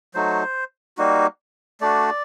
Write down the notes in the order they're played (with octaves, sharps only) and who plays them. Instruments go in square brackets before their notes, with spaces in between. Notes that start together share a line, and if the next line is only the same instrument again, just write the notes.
[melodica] F#3 A3 D#4 F#4 C5
G3 A#3 D#4 F#4
A3 D4 F#4 D5